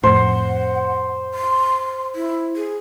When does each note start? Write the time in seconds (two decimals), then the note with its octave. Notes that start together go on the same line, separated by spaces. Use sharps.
0.03 F2 A2 C5 F#5
1.34 C6
2.15 E4
2.56 G#4